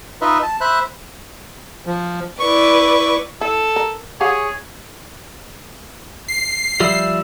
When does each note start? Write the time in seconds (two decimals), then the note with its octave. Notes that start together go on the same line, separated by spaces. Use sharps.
0.21 D#4 F4 B4 D#5 E5
0.43 A5
0.61 C5 E5 B5 F#6
1.86 F3
2.40 E4 B4 D5 C#6
3.41 E4 A4
3.76 A#4
4.21 G4 G#4 C#5 F5 F#5
6.28 C7
6.80 F3 G3 E5